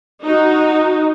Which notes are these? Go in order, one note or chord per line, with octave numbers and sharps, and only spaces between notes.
D#4 F#4